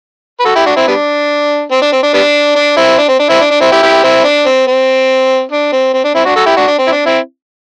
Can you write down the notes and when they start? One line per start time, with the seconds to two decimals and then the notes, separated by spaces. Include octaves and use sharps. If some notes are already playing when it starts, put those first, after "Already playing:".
0.40 B4
0.45 F#4 A4
0.55 E4 G4
0.66 D4 F#4
0.76 C4 E4
0.88 G3 B3 D4
1.71 C4
1.82 D4
1.93 C4
2.03 D4
2.14 G3 B3 D4
2.56 D4
2.77 C4 E4
2.98 D4
3.08 C4
3.19 D4
3.30 C4 E4
3.40 D4
3.51 D4
3.61 C4 E4
3.72 E4 G4
3.83 E4 G4
4.03 C4 E4
4.24 D4
4.46 C4
4.67 C4
5.51 D4
5.72 C4
5.93 C4
6.04 D4
6.14 C4 E4
6.25 D4 F#4
6.36 F#4 A4
6.46 E4 G4
6.57 D4 F#4
6.67 D4
6.78 C4
6.87 E4
6.92 D4
7.06 C4 E4